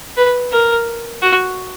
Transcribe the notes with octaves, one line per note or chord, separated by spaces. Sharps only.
B4
A#4
F#4